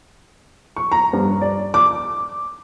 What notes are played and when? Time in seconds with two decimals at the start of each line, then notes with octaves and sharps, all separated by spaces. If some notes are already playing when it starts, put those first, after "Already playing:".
0.76 C#6
0.92 A#5
1.13 G2
1.41 D5
1.74 D6